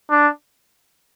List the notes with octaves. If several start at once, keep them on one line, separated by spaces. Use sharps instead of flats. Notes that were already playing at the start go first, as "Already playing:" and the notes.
D4